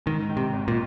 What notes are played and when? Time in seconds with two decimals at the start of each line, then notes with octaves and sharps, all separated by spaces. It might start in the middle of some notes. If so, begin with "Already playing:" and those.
0.06 G#2 D#3
0.30 D#3
0.37 C3
0.53 G#1
0.68 A#2